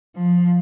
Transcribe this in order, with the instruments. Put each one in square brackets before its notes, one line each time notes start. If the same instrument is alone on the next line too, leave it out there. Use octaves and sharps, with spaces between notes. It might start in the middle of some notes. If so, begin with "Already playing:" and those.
[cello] F3